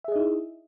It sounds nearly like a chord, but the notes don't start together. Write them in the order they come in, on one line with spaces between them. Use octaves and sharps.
E5 G#4 D#5 D#4 E4